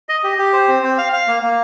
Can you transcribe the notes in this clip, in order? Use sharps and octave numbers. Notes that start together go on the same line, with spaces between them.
D#5
G4
G4
C5
C4
C4
F5
F5
A#3
A#3